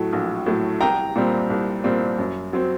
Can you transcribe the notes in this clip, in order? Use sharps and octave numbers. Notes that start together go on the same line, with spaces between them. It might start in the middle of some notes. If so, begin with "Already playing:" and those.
Already playing: A2 F#3 A3
A#1
A2 F#3 A3
C2 G5 A#5
A#2 G3 C4
C2
A#2 G3 C4
F#2
F#3 C4